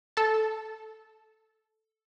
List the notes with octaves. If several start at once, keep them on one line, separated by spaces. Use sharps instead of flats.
A4 A5